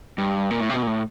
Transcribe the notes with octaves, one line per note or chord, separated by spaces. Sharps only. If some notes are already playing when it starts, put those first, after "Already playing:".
G2
A#2
A2
C3
B2
A#2
A2